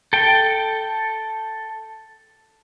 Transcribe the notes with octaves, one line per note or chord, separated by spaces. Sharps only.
A4 G5